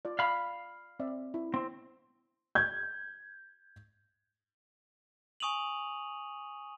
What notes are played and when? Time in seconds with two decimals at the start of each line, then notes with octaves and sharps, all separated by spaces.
0.05 F4 D5
0.19 D5 F5 B5
1.00 C4 D5 E5
1.34 E4
1.54 C4
2.55 G6 G#6
5.40 G#5 C#6 D#6 D#7 F7 F#7